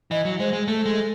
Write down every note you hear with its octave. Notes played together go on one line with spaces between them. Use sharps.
E3 D#5
F#3
G#3 C5
G#3
A3 A4
G#3